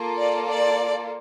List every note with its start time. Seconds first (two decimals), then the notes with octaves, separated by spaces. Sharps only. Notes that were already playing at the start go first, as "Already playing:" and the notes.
Already playing: A#3 F4 A4
0.18 D5
0.49 D5